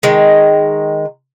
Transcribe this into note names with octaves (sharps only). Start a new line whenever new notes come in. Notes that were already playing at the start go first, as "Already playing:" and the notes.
D#3 G#3